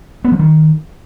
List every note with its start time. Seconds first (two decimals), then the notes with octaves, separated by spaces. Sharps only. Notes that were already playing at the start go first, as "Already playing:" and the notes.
0.24 B3
0.32 F3
0.39 D#3